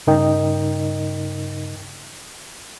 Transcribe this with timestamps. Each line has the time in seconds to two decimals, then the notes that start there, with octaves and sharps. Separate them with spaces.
0.07 G2 C#3 D#4 A#4 D#5 G5